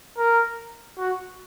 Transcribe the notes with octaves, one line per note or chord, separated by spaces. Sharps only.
A#4
F#4